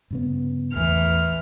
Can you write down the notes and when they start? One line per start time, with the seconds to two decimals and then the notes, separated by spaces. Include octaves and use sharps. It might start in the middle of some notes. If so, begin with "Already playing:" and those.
0.11 G2 C#3 B3
0.74 A1 E2 E3 F6